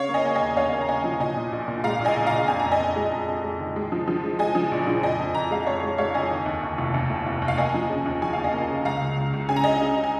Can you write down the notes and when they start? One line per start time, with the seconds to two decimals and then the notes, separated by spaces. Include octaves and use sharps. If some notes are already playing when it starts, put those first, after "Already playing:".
Already playing: C#3 C#5 F5
0.09 A#3
0.14 D#5 G#5
0.25 A#3
0.35 D#5 G#5
0.41 D#2
0.57 D#2 C#5 F5
0.73 A#3
0.81 A#5
0.89 D#2 D#5 G#5
1.04 F3
1.20 A#2 D#5 G#5
1.37 A#2
1.52 A#1
1.68 A#2
1.84 G#3 F5 A#5
2.00 A#1
2.05 D#5 G#5
2.16 A#1
2.27 A#1 F5 A#5
2.47 F2 G#5
2.59 F2 A#5
2.71 D#5 G#5
2.80 F2
2.96 G#3
3.12 F2
3.28 F2
3.43 G#3
3.59 D#3
3.76 G#3
3.92 F3
4.08 F3
4.23 G#3
4.39 G#3 D#5 G#5
4.55 F3
4.72 A#1
4.87 F3
5.03 F2 D#5 G#5
5.19 F2
5.34 F2 A#5
5.51 G#3 F5 A#5
5.66 F2 C#5
5.83 G#3
5.98 G#3 C#5 F5
6.14 F2 D#5 G#5
6.30 D#3
6.46 D#2
6.63 D#2
6.78 F1
6.94 D#2
7.10 F1
7.26 F1
7.42 D#2
7.48 F5
7.58 A#3 D#5 G#5
7.74 F3
7.90 C#3
8.06 D#2
8.22 F3 G#5
8.33 D#2 F5
8.44 D#5 G#5
8.54 A#3
8.70 C#3
8.85 C#2 F5 A#5
9.01 C#2
9.17 C#2
9.34 C#2
9.49 C#3 G#5
9.56 A#5
9.64 C#3 D#5 G#5
9.82 C#3
9.98 C#3
10.04 G#5